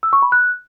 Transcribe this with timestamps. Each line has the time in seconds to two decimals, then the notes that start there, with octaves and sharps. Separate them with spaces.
0.03 E6
0.13 C#6
0.22 B5
0.32 F#6